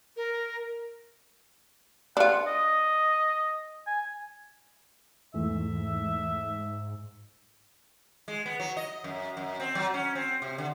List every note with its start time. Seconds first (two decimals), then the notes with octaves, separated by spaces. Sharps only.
0.17 A#4
2.17 D4 F4 F#5
2.47 D#5
3.87 G#5
5.34 E2 G#2 E3 A3 E5
8.28 G#3
8.46 B3
8.60 F#3
8.77 D#5
9.04 F#2
9.37 F#2
9.60 C4
9.75 F#3
9.94 C#4
10.15 C4
10.42 C3
10.58 D3